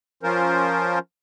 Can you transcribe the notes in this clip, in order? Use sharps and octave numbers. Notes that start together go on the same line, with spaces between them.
F3 C#4 F4 A#4 C5